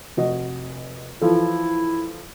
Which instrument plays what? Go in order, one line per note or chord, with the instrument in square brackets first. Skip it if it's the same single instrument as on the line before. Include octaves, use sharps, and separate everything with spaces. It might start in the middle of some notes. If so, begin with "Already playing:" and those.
[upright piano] F1 F#4 D#5
[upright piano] E3 F3 A4 [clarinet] E4